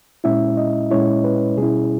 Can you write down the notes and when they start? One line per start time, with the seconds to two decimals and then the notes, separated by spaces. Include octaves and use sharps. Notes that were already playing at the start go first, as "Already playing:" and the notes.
0.24 A#2 G#3 C#4 E4 E5
0.57 D#5
0.91 A#2 G#3 C#4 E4 C#5
1.24 B4
1.58 B2 G3 C#4 E4 G#4